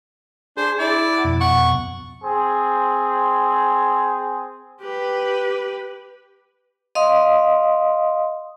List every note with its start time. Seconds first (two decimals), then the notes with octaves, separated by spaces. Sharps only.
0.57 D4 G#4 C5 G#5
0.79 E4 D5
1.13 F#5 A5
1.24 F2 B2
1.41 F#5 C#6
2.24 C4 G#4
4.81 G4 B4
6.95 D#5 F5 C6 D#6